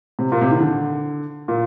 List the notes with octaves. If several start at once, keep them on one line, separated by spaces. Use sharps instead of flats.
C3
A#2
C3
D#3
D3
A#2